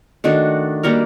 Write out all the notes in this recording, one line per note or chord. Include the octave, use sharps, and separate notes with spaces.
D#3 A3 D4 F#4
G3 A#3 F#4 A#4